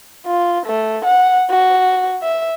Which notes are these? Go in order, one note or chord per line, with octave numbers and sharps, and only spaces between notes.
F4
A3
F#5
F#4
E5